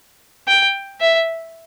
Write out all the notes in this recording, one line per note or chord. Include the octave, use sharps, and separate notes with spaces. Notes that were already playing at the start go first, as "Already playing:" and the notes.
G5
E5